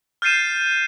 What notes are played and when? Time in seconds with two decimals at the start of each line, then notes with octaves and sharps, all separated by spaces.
0.22 F6 G6 A6 C7 D#7 E7